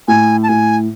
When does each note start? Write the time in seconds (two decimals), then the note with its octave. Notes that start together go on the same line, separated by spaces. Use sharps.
0.08 A2 G#5
0.43 A5
0.48 A2 G#5